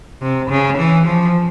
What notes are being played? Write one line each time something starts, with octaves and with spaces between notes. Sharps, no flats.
C3
C#3
E3
F3